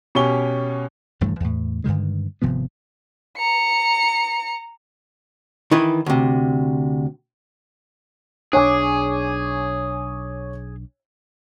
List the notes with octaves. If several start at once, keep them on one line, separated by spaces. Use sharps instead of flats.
B2 C#4 G4 G#5 C#6 G7
D#1 G2 E3 A3
E2 A2
G2 D3 D#3 G#3
G#1 C3 F3 B3
A#5 C#7
D#3 E3 E4 B4
D2 C3
B1 D4 G#4 C#5 G#5 D6